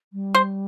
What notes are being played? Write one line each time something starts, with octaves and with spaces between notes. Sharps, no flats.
G3
C5